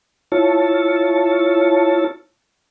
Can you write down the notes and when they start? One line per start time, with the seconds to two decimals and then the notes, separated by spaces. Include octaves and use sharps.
0.32 E4 F4 C#5 A5